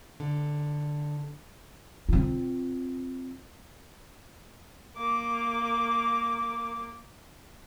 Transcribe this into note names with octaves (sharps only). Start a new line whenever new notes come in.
D3
C4 F4
A#3 D6